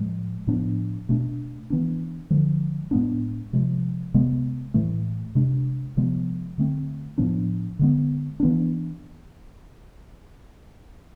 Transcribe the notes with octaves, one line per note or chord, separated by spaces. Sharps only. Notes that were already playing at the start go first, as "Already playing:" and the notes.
Already playing: A2 F3 G#3
A2 F3 B3 D4
B2 A3 D4
E3 B3 D4
D3 F3 G#3
A2 G#3 B3 D4
C3 F3 G#3
C3 G#3 B3
A2 E3 A3
C3 G#3 D4
C3 F3 G#3 B3
D3 A3 C4
A2 F3 B3 D4
D3 G#3 B3
E3 B3 D4